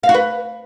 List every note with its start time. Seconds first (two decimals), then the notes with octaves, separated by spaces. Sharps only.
0.03 F5
0.09 F#4
0.14 B4